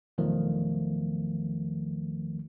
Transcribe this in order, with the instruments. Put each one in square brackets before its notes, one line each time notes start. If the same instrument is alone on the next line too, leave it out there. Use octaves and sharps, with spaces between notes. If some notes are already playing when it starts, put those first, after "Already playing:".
[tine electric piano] B1 E2 D#3 F3 A3